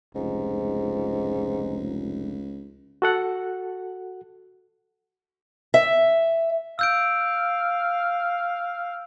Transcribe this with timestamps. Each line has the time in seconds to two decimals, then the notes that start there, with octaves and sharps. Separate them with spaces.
0.15 F1 C#2 G#2
3.02 F#4 A4 F#5
5.74 E5
6.79 F5 E6 G6 D7